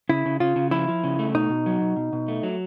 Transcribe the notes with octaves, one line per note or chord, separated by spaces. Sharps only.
C#3 E4
C#3
C#3 F4
C#3
F3 E4
F3
C#3
A3
B2 D#4
B2
F#3
B2
B2
B2
A3
F#3